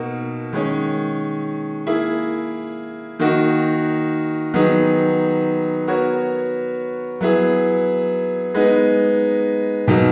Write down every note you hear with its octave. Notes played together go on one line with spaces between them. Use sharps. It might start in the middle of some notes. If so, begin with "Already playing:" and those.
Already playing: B2 A#3 D#4 F#4 A#4
D#3 G#3 C#4
A#3 E4 G#4
D#3 A#3 D#4 F#4
D#3 F#3 B3 D#4 G#4
B3 F#4 A#4 C#5
F#3 B3 E4 G#4
G#3 B3 D#4
B2 F#3 A#3 D#4